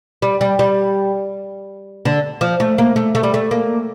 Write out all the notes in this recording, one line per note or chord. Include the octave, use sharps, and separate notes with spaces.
G3
G3
G3
D3
F3
A3
A#3
A3
A3
G3
A3
A#3